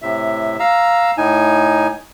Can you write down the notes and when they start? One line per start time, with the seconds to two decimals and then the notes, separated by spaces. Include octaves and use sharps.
0.02 A2 C3 E5
0.60 F5 A#5 E6
1.17 A2 D#4 G#5